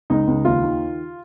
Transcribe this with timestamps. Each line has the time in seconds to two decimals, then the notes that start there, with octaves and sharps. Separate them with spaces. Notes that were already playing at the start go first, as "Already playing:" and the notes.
0.10 C#2 D#4
0.27 C#2
0.45 D#2 F4
0.63 D#3